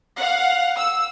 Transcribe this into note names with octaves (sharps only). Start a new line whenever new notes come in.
F5 F#5
E6